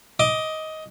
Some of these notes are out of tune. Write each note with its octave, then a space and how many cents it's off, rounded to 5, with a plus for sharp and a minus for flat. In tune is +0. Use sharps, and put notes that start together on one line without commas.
D#5 +15 D6 +15